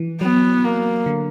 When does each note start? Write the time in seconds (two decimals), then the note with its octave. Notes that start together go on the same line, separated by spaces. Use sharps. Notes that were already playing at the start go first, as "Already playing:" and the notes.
Already playing: E3
0.21 F#3 B3
0.64 A#3
1.06 D3